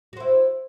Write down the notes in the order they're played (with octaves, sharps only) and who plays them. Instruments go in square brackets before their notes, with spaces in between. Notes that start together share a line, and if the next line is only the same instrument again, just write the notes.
[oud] F#4
C5
E4